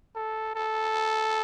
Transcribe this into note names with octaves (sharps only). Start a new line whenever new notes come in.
A4
A4